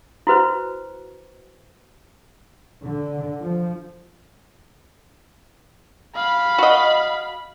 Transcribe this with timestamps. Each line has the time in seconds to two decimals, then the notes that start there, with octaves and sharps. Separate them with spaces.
0.27 E4 F#4 B4 C5
2.84 D3
3.41 F3
6.16 F5 B5
6.58 F#4 D#5